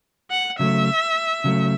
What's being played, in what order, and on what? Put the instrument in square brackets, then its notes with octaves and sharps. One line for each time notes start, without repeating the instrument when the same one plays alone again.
[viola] F#5
[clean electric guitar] C#3 F#3 A3 [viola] E5
[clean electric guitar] C#3 F#3 A3